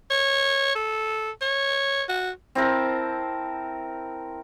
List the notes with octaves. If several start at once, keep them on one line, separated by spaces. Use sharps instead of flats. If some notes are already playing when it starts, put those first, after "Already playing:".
C#5
A4
C#5
F#4
C4 E4 A#4 A5